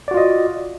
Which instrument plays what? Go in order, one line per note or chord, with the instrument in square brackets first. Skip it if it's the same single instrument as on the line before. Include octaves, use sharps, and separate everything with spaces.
[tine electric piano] D5
F#4
F4
D#5